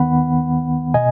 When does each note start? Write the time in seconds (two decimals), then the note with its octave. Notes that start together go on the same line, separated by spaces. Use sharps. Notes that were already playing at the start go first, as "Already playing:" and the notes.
Already playing: D#2 D#3 B3 F#5 B5
0.94 B2 D#5 G#5